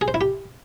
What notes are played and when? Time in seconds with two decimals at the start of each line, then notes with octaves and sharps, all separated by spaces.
0.01 G#4
0.08 C5
0.14 E4
0.21 G4